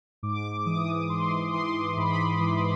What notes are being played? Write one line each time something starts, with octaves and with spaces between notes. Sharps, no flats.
G#2 D6
D6
E3 D#6
G#2 C6
E3 C6
G#2 B5
E3